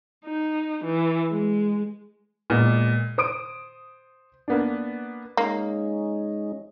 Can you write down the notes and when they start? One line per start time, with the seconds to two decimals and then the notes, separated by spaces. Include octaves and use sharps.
0.25 D#4
0.84 E3
1.31 G#3
2.50 A#2 G#3 B3
3.18 C5 D#6 D7
4.48 A#3 B3 D4
5.37 G#3 A#3 C#4 D#4